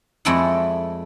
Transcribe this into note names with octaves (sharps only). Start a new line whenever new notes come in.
F2 G#3 A3 E4 D5 F#5